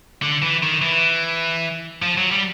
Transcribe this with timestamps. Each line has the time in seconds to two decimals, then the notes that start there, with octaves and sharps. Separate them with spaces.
0.22 D3
0.42 E3
0.63 D#3
0.82 E3
2.02 F3
2.17 F#3
2.31 G3